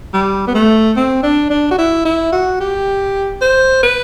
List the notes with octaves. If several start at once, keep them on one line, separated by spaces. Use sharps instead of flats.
G3
B3
A3
C4
D4
D4
F#4
E4
E4
F#4
G4
C5
B4